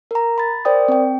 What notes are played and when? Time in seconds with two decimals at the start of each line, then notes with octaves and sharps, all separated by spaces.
0.11 A#4 A#5
0.38 B5 A6
0.65 A#4 C5 D5 G5 D#6
0.88 C4 G5